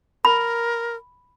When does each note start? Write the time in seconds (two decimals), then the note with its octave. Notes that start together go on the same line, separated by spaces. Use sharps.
0.25 A#4 B5